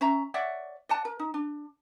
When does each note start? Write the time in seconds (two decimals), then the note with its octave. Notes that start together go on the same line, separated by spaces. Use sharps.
0.01 C#4 E5 A#5
0.34 C#5 D5 E5 F#5
0.89 D5 F#5 A5
1.05 A#4
1.19 D#4
1.34 D4